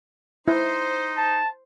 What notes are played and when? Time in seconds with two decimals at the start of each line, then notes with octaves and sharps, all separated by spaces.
0.48 D#4 E4 C5
1.17 A5